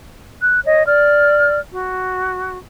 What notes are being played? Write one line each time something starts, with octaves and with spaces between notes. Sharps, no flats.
F#6
C#5 D#5
D5 F6
F#4